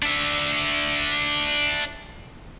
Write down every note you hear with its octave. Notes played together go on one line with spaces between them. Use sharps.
D4 E5